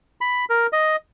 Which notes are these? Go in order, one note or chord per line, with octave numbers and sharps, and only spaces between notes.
B5
A#4
D#5